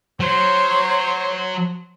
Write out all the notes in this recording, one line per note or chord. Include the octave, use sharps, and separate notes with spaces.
F#3 C5 C#5